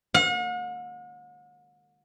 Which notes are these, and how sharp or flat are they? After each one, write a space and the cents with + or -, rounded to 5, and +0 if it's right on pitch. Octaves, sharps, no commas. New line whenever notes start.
F#5 -45